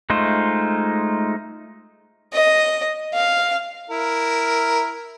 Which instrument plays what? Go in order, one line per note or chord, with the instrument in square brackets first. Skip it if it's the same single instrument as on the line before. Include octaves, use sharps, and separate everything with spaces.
[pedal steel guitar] G#3 A3 D#4 F4 C5
[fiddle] D#5
F5
[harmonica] E4 A#4